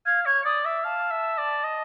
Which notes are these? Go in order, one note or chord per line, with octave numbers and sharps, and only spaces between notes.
F5 G#6
C#5 G#6
D5 D#6
E5 D6
F5 A5
E5
D5
D#5